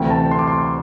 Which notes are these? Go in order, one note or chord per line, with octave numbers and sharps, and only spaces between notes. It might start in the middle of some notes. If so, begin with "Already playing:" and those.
Already playing: D2 C3 E3 G5
A5
C6
D6
C6